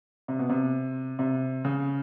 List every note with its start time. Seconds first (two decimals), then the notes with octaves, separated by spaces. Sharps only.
0.28 C3
0.39 B2
0.49 C3
1.19 C3
1.65 C#3